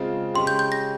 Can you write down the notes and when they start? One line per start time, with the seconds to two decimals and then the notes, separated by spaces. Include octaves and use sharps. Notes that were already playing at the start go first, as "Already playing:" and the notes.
Already playing: C#3 G#3 C4 F4
0.34 C#3 G#3 C#4 G4 C6
0.47 G6
0.59 G6
0.72 A#6